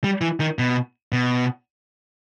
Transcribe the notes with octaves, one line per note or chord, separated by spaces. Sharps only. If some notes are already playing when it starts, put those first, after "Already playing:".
G3
E3
D#3
B2
B2